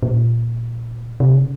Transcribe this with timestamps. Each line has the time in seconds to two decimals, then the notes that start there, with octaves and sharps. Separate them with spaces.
0.03 A#2
1.20 C3
1.35 C#3